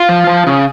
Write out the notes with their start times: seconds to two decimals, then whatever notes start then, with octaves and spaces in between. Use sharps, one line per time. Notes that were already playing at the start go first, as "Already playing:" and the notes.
Already playing: F4
0.09 F3
0.27 F3
0.47 C#3